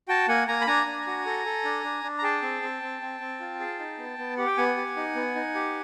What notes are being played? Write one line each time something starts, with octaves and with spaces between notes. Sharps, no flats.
F#4 G5 A5
A#3 F#5 G#5
A#3 G#5 A#5
B5
D4 G#5 A#5
D4
F#4
A4
A4
D4
D4
D4
A#5
G#4 G5 A5
C4
C4
C4
C4
C4
F4
G#4
D#4
B3
B3
G4 F#5
G5
B3 F#5 G#5
G4
D#4
B3
D#4
G4